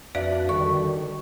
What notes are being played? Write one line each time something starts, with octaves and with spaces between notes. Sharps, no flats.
F2 D4 F#4 B4 D5 E5 F5
D3 D#3 G3 C#6